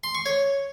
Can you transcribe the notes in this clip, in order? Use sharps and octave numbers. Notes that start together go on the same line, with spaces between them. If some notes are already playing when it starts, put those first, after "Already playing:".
C6
C#6
C#5